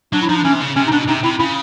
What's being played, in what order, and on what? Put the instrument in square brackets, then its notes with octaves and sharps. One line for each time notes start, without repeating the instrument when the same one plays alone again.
[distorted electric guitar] F#3 [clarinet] D4
[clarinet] E4
[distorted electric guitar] F3 [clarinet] D#4
[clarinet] D4
[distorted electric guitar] E3 [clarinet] C#4
[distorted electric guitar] C3
C#3
[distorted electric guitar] C3 [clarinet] C#4
[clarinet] D#4
[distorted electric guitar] B2 [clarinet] D4
[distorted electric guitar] C3 [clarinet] D#4
[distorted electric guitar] C3 [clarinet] E4
[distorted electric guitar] C#3 [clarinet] E4